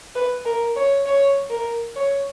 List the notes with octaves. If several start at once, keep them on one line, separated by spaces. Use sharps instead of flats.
B4
A#4
C#5
C#5
A#4
C#5